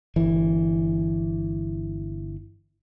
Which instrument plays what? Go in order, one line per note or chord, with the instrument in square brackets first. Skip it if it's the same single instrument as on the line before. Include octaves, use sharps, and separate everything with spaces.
[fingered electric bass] G1 E3